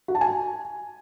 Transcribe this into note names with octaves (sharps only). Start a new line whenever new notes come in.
F#4
A5
G#5